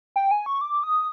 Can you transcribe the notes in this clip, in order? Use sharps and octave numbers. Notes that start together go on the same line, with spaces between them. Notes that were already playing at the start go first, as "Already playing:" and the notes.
G5
G#5
C#6
D6
D#6